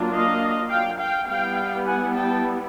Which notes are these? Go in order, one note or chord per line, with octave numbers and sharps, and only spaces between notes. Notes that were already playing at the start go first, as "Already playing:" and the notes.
Already playing: F#3 A#3 D4 F4
D#5 F5
F5 G5
F5 G5
G3 B3 E4 F5 G5
F#5 G#5
G5 A5